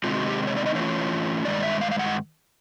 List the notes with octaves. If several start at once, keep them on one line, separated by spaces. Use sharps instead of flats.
C3 D#3 G#3 C4 D#4 F4
F#4
G4
C#5
D5
D#5
E3 A3 C#4 F4 C#5
G2 D#3 G#3 D5
E5
F5
F5
F#5